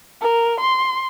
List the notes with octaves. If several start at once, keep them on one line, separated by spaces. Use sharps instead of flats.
A#4
C6